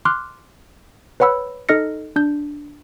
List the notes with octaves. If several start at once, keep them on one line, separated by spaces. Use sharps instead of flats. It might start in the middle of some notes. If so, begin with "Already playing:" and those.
C6 D6 F6 F#6
B4 C#5 F#5 B5 E6
D#4 A4 D#5 F6 A#6 C#7
D4 G6